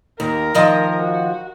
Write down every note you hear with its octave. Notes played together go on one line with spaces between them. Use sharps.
D#2 A#4
D#3 F3 D#5
F#4